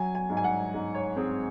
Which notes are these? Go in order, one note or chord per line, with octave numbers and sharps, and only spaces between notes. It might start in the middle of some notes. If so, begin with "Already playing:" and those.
Already playing: F#3 G#5
G#5
G#2
G#5
F#5
G#2
C#5
C4 G#4